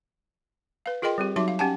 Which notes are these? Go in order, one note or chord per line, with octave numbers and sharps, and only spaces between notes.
B4 F5
F4 G#4 A#4 D#5 G5 C6
G3 C4 G4
F#3 D#4 F#4 E5 C6 D6
F5
C#4 G4 F#5 G#5 A5